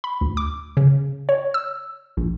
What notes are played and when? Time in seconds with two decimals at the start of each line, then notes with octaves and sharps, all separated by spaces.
0.04 B5
0.21 D2
0.37 D6
0.77 C#3
1.29 C#5
1.54 E6
2.17 A#1